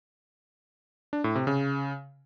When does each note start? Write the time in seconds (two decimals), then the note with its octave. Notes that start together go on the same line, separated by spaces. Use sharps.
1.13 D4
1.24 A2
1.36 C3
1.47 C#3